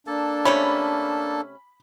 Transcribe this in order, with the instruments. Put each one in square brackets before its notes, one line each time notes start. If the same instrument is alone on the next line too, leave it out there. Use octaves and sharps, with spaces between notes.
[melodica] A#3 A4 A5 [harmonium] D4
[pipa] C3 A3 C#4 [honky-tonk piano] B5